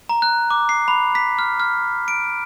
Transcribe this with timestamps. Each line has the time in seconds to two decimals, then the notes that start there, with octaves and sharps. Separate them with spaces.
0.09 A#5
0.22 F#6
0.51 D6
0.69 C7
0.88 B5
1.15 B6
1.39 F6
1.60 F6
2.08 D7